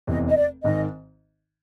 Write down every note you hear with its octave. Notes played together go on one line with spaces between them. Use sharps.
F1 E2 C3 D#5
D#5
D5
G#1 G#2 D#3 D#5